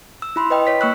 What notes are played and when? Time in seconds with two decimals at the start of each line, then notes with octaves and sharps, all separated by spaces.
0.22 E6
0.36 E4 B5 C6
0.50 B4 D#5 G5
0.67 C#5 B6
0.81 A#3 C#6 E6 F#6